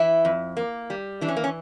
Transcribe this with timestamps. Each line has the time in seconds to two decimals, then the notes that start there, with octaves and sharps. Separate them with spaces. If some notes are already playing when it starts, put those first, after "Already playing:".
Already playing: E3 E4
0.25 F2
0.57 A#3
0.90 G3
1.21 E3 D4
1.28 C#4
1.36 A#3
1.44 C#4